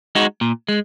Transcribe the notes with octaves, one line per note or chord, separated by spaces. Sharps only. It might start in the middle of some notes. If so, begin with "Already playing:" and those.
G#3 D#4 F#4
A#2
G#3